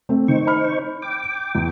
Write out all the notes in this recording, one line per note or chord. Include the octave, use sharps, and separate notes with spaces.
A3 C4
D#3 D#4 C5 C#6
B5 F6
G5 D6
E2